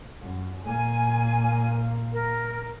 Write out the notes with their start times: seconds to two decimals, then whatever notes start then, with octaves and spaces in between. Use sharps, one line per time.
0.20 F#2
0.65 A#2 A#3 G#5
2.11 A#4